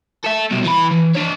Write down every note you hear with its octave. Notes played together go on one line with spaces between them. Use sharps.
A4 E5
C2 B2
E3 B5
E3
D4 C#5